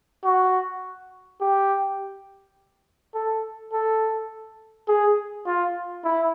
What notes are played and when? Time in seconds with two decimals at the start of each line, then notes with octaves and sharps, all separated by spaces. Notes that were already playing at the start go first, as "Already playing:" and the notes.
0.24 F#4
1.41 G4
3.14 A4
3.73 A4
4.88 G#4
5.47 F4
6.04 E4